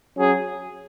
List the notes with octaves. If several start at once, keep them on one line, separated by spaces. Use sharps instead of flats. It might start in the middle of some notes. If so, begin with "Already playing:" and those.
F#3 C#4 G#4